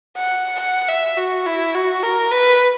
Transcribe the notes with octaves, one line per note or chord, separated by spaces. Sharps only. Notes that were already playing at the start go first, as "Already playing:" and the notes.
F#5
F#5
E5
F#4
E4
F#4
A#4
B4